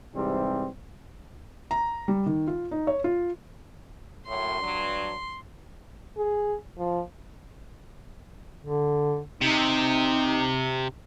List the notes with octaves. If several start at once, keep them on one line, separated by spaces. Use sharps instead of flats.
G#2 C3 E3 G3 C4
A#5
G3
D#3
F4
D#4
C#5
F4
F#2 A2 C6
G2 F#3 D4
G#4
F3
D3
C3 D#4